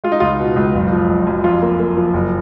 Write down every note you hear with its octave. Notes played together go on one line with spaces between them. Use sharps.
G#3 F4
D#4
C#2 F4
B2
C#2
F#1
F3
F#1
F#2
F2 F4
A#3
A#3
F3
F#1